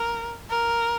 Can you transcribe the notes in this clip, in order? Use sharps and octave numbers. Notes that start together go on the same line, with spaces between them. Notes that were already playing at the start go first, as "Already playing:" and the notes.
Already playing: A#4
A#4